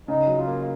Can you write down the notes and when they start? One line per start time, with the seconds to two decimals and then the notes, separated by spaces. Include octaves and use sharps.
0.08 C#3 D#4
0.27 F#3
0.37 F4
0.47 A#3